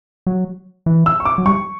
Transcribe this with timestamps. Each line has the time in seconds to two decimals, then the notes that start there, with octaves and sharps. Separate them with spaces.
0.27 F#3
0.86 E3
1.06 E6
1.20 C#6
1.25 D6
1.38 F#3
1.46 G3 C#6